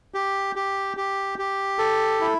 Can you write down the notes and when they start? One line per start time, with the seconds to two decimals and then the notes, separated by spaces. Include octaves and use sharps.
0.14 G4
0.56 G4
0.97 G4
1.39 G4
1.79 A4
2.20 E4